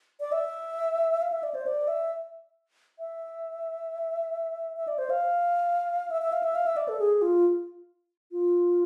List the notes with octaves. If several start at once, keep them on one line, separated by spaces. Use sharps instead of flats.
D5
E5
F5
E5
D5
C5
D5
E5
E5
E5
D5
C5
F5
E5
E5
F5
E5
F5
E5
D5
A4
G#4
F4
F4